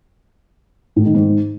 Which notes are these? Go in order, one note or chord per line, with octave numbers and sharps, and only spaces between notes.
A2
D#3
G#2